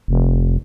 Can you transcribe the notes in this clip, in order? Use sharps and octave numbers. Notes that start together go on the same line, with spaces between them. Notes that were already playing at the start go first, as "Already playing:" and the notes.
F1